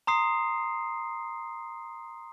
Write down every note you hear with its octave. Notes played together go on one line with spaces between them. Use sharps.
A#5 C6 D#6 C7